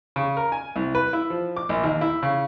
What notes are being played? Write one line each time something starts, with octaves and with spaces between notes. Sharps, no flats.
C#3
A#4
G#5
C2
B4
E4
F3
D6
A#1
D#2
E4
C#3